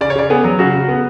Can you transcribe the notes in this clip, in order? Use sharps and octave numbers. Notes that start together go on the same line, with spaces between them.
C#3 D5
C#5
C#3 D5
B3 G#4
F#3
C#3 F#4
C#3
B3